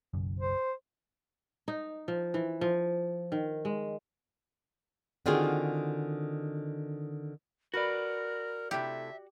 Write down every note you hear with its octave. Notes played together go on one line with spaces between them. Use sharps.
F#1 B1 F#2
C5
D#4
F3
E3
F3
D#3
G#3
D3 D#3 C4 F4 F#4 G#4
F#4 A#4 B4 D5
C3 A3 E4 G4 E5